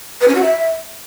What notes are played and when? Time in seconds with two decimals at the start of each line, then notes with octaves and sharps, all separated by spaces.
0.21 B4
0.28 C#4
0.35 F#4
0.42 E5